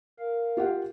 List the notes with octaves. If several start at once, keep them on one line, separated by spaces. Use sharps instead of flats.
A#4 F5
F4 G4 F#5